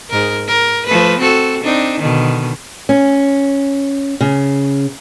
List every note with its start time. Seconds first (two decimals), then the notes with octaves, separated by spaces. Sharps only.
0.10 G#2 A#4
0.48 A#4
0.86 F3 A3 B4
1.19 C4 F#4 A4
1.64 C4 D4 D#4
2.00 B2 D3 D#3
2.89 C#4
4.21 C#3